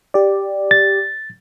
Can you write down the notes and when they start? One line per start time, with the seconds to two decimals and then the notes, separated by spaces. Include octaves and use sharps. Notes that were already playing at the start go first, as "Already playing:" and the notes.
0.14 G4 D5
0.71 A6